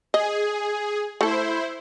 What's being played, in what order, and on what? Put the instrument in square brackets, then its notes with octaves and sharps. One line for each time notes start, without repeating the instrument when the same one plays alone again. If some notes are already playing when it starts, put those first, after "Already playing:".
[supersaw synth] G#4 [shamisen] D#5
[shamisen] A3 A4 [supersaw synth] E4 C5